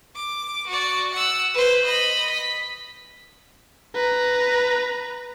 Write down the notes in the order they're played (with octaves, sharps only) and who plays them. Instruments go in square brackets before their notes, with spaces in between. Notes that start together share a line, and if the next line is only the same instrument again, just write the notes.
[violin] D6
F#4 D5
F#5 E6
B4 C5
D#5 B5
B6
[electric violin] B4 A#5